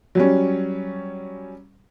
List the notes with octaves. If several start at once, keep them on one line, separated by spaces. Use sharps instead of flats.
F#3 G3 C#4